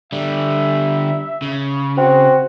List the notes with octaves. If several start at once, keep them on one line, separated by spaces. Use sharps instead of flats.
D3 G3 E5
C#3
C4 F#4